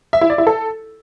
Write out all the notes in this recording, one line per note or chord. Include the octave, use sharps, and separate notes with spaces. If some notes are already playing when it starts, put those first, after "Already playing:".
E5
E4
D5
E4
A4